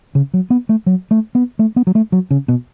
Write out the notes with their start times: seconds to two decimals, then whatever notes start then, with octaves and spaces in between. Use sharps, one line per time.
0.15 C#3
0.34 F#3
0.50 B3
0.69 A3
0.86 F#3
1.11 A3
1.35 B3
1.59 A3
1.76 B3
1.87 F#3
1.95 A3
2.12 F#3
2.31 C#3
2.48 B2